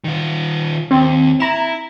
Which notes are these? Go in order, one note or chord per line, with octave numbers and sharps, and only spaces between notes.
D#3 F4
D#2 C4
E4 A#5 E7